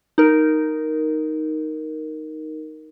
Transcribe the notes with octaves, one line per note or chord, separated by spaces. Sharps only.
D#4 A#4